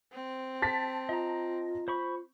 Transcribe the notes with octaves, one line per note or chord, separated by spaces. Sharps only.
C4
A5 A6 B6
F4 D#5 A#5
C5 B5 C#6